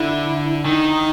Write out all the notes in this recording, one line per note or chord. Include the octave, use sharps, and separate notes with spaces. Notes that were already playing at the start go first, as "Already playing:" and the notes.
Already playing: D3 E4
D#3 D#4